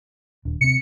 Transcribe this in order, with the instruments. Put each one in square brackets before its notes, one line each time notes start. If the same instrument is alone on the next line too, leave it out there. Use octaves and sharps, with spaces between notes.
[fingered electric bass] D#1 D4
[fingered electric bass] C3 C4 [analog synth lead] C#7